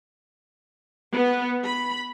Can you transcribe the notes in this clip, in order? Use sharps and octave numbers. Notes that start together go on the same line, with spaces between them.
B3
B5